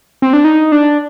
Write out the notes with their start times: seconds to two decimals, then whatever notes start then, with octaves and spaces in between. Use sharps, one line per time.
0.22 C4
0.33 D4
0.44 D#4
0.72 D4